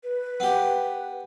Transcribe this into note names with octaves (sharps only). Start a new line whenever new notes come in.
B4
B3 G4